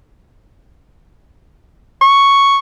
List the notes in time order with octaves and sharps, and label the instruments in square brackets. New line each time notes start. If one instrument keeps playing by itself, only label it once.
[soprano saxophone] C#6